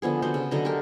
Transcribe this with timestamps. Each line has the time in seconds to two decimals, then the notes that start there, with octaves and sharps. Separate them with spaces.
0.02 D3 F3 B3 G#4
0.22 D3 B3 F#4 C5
0.34 C#3
0.51 D3 F#3 D#5 A#5
0.65 G4 A#4